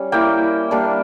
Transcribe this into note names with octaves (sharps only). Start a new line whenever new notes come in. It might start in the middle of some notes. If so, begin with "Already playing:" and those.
Already playing: G3 C#4
A#3 E4 G5
G3 A#3 D4